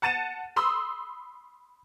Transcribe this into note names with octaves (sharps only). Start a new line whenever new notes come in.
F#5 A5 A6 D#7 E7
B5 C6 D#6 E6